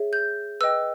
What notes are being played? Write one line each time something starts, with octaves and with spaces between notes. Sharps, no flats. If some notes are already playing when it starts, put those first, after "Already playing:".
Already playing: G#4 C#5 E5
G6
B4 D#5 G5 E6